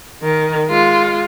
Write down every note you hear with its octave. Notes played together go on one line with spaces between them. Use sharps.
D#3
G#3 F4